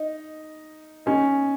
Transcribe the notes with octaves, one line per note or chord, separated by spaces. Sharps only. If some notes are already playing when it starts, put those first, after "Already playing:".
Already playing: D#4
C#4 D#4